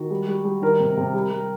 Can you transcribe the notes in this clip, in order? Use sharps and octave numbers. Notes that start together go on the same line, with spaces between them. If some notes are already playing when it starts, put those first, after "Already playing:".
Already playing: D#3 F#4
G3
G3
G3
D#3 A#4
C3
C3
G3
G3